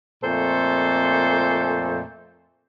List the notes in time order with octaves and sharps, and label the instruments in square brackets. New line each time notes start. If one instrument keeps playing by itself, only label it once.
[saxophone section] F2 A#2 A3 A4 C5